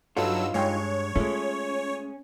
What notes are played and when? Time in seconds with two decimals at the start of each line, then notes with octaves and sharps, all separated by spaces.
0.17 G2 F#3 D#4 F4 A4 E6
0.54 G2 G#3 C#5 G5
1.16 G#3 A3 C#4 F4